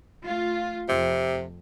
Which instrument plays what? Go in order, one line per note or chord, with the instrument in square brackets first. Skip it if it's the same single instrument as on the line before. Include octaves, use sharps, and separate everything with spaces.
[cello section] A3 F4
[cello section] F2 [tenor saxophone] C3